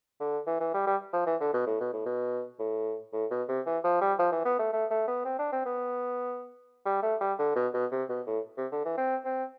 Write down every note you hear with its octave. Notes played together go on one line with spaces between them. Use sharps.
D3
E3
E3
G3
G3
F3
E3
D3
B2
A2
B2
A2
B2
A2
A2
B2
C3
E3
F3
G3
F3
E3
B3
A3
A3
A3
B3
C4
D4
C4
B3
G3
A3
G3
D3
B2
B2
C3
B2
A2
C3
D3
E3
C4
C4